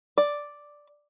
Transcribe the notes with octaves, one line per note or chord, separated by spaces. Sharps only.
D5